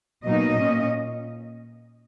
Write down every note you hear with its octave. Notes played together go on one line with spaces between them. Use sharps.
B2 F#3 A#3 D#4 D#5
A#2 A#3 C#4